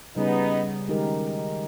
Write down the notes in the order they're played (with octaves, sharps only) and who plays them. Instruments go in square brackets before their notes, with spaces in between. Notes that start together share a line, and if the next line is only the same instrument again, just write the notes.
[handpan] C#3 G3 C#4 G#4 [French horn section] B3 D#4
[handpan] D#3 G#3 D#4 G4 A#4